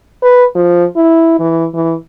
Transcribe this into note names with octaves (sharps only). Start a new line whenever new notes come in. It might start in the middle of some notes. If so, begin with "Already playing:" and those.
B4
F3
E4
E3
E3